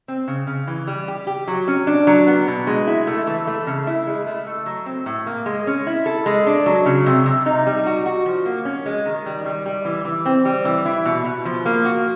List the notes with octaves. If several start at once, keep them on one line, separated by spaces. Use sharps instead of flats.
C4
C#3
C#3
E3
G3
G4
G4
F#3
C#4
D4
F#3
B3
B2
G#3
E4
A3
E3
A3
C#3
E4
G#3
A3
A3
F#3
C4
A2
A#3
G#3
C#4
E4
A4
G#3
D4
F#3
C#3
C3
C3
D#4
G3
F#4
F#4
F3
A#3
C#4
G#3
D#3
G3
G3
G3
E3
E3
C4
G3
E3
E4
B2
B2
F3
A#3
F#4